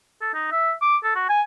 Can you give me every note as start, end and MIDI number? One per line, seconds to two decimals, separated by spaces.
0.21 0.33 69
0.34 0.51 63
0.52 0.73 76
0.82 0.97 86
1.04 1.14 69
1.16 1.26 66
1.30 1.42 80